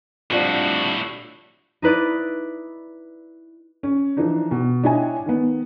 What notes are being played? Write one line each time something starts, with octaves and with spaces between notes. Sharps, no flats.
F2 A2 G3 D4 F#4
D#4 E4 B4 D5
C#4
E3 F3 D4 D#4
B2
D4 E4 C#5 D#5 G5 G#5
D#3 B3